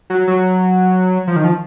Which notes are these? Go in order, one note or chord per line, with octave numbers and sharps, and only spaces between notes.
F#3
F#3
F3
D#3
F3